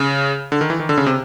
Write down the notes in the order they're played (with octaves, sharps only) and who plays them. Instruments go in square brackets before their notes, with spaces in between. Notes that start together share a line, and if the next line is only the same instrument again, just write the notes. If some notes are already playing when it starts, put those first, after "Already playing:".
Already playing: [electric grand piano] C#3
D3
D#3
E3
D#3
D3
C#3
C3